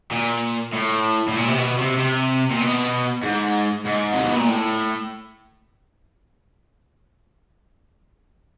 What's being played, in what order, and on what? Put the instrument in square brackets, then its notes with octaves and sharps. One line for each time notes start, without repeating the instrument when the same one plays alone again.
[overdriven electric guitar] A#2
A2
A2
A#2
C3
B2
C3
C3
A#2
B2
G#2
G#2
C3
B2
A#2
A2